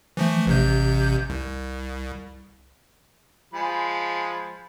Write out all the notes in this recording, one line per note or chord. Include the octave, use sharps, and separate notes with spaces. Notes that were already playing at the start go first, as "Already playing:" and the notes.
E3 F3 A3
A1 C3 G6
C2
F3 G#3 B5